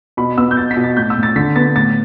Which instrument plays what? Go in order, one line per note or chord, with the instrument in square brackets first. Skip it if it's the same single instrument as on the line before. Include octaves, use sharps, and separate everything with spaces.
[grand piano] B2 B5
B3 E6
G6
B2 A6
B6
B2
A6
A2 G6
E6
A2
A6
D3 B6
B3 A6
A2 A6